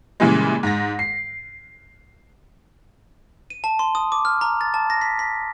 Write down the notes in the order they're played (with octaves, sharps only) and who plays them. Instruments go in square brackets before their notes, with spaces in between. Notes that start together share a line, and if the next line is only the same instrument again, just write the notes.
[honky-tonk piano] A#2 C#3 E3 G3 G#3
G#2 A#6
C7
[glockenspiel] D#7
A5
C6
D#6
D6
F6
A#5
A6
A5
A#6
B6
B6